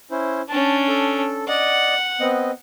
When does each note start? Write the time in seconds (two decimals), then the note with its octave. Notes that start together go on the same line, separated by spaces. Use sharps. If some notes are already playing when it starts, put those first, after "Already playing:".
0.11 C#4 E4 C5
0.49 C#4 D4 A5
0.89 A4
1.48 D5 D#5 F#5
2.20 B3 C4 D#5